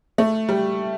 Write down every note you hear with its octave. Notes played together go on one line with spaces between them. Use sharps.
A3
G3